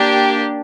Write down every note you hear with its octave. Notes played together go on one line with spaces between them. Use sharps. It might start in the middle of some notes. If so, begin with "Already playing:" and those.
Already playing: A#3 D4 G4